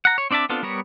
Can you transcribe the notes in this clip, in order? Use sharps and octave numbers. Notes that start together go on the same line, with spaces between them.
F#5 A#5
C#5
C4 D4 D5 E5 A5
B3 C4 D4 F4 A4
G3 B3 A#4 C#5